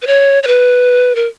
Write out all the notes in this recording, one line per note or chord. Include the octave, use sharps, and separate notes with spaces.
B4
C#5
C#5
B4
A#4